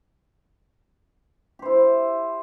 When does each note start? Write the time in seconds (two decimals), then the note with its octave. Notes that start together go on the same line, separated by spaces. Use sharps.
1.59 G4
1.62 C5
1.65 E4